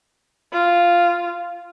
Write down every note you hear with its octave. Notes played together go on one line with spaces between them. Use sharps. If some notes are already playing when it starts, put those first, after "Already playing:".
F4